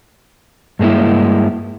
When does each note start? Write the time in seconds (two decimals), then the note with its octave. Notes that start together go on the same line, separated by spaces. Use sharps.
0.79 G2 G#3 A#3 E4